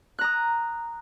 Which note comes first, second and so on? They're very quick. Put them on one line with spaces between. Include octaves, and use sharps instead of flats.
F#6 A#5 D#6